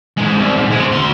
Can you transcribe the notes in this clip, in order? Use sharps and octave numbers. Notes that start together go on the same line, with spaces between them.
G#2 G#3
C2
G#2
G#3 C4
D2 C6